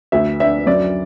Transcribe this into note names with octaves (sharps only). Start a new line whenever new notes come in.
D2 E5
D4 E5
F#2 D5